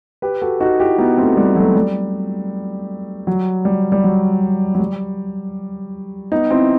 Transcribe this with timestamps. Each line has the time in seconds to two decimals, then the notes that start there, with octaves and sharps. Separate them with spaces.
0.22 G4 B4
0.42 F#4 A4
0.60 D#4 F#4
0.80 E4 G4
0.98 B3 D#4
1.18 A3 C4
1.37 G3
1.55 F#3 A3
1.76 G3
3.27 F#3
3.65 G3
3.92 G3
4.04 F#3
4.75 F#3
4.80 G3
6.32 B3 D#4
6.50 C4 E4